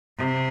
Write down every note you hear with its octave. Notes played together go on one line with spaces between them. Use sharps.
C3